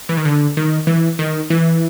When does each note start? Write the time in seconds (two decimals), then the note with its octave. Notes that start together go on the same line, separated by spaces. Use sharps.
0.09 E3
0.17 D#3
0.25 D3
0.57 D#3
0.87 E3
1.19 D#3
1.50 E3